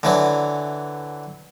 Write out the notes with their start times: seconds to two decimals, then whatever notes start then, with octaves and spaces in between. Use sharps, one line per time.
0.03 D3 E3 F#3